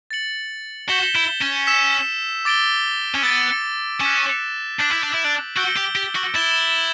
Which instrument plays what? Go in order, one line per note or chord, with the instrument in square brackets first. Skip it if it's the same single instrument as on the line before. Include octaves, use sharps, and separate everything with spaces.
[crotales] A6 C#7 F#7
[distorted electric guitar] F#4 [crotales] G6 B6 E7 G7
[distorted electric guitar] E4
C#4
[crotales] E6 B6 E7
D6 A6 D7 G7
[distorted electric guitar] C#4
[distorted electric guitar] B3 [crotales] E6 A6 D7
[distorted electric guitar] C#4 [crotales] F#6 B6 E7
[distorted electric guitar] D4 [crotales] D6 G6 B6 D7 F#7
[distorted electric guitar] E4
D4
E4
D4
[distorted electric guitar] F#4 [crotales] E6 G6 D7 G7
[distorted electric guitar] G4
G4
F#4
[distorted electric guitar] E4 [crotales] A6 E7 G7